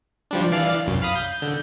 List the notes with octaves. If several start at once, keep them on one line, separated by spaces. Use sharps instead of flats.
F3 G3 D4
E3 D5 F5
C2 F#2
F5 B5 D#6
G6
D3 G6